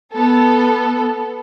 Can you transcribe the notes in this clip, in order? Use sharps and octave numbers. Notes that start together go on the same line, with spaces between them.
B3 A4